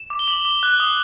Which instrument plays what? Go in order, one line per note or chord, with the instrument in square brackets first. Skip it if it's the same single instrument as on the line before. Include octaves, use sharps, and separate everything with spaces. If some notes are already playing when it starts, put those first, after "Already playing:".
Already playing: [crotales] E7
D6
G7
D6 F#7
D6
F#6
D#6